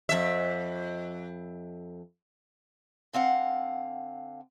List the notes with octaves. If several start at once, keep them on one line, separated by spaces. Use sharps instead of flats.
F2 E5
D3 C4 F5 F#5